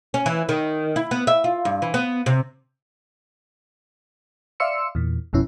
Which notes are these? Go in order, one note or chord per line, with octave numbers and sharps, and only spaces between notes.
C#4
E3
D#3
E4
B3
E5
F4
G2
E3
B3
C3
D5 E5 F5 C6 E6 C#7
E2 A#2
G#1 F2 B2 C#4 E4